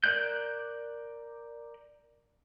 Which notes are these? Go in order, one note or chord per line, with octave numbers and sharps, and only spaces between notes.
A#4 D5 F#6 G6